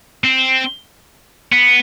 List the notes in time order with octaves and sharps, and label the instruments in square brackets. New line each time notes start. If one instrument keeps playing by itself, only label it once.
[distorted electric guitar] C4
B3